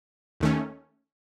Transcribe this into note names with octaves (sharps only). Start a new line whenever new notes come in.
D#2 D#3 A3 C#4